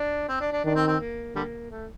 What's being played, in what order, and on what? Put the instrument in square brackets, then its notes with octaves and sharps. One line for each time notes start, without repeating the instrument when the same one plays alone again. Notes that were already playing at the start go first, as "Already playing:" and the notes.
Already playing: [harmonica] D4
C4
D4
D4
[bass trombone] D#3 [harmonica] D4
[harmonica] C4
C4
A#3
D3 G3 A#3
A3